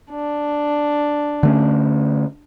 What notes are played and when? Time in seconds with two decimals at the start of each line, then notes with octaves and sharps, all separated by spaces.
0.11 D4
1.43 D3 A3 C#4